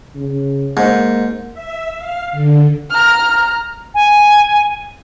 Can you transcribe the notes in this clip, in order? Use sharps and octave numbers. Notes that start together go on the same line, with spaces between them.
C#3
G#2 A#3
E5
F5
D3
A#5 F6
G#5